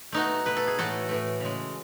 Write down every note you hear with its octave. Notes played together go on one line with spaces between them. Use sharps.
B2 A3 D#4 F#4
B2 A3 B4
A4
G#4
A2 E3 A3 F#4 A4
A2 E3 A3
C#3 G#3